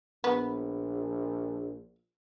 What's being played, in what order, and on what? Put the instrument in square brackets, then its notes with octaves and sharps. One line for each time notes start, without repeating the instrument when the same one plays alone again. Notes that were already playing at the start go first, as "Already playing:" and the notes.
[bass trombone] A#1 [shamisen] B3